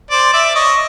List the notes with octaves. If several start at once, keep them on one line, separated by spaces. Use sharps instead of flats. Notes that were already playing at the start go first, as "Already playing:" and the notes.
C5 D5
D5 E5
C#5 D#5